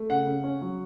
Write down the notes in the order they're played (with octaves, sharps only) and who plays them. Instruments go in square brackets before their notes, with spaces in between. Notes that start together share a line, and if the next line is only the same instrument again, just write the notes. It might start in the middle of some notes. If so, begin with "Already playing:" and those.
Already playing: [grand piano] A3
C#3 F#5
C#3
C#4
F#3